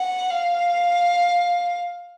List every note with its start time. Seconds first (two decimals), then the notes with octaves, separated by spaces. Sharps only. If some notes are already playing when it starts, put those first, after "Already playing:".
Already playing: F#5
0.31 F5